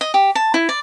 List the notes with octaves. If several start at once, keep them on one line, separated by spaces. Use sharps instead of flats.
D#5
G4
A5
E4
D5